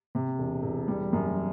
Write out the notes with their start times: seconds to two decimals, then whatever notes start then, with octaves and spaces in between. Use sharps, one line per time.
0.15 C3
0.39 E1
0.63 E1
0.88 G3
1.13 F#2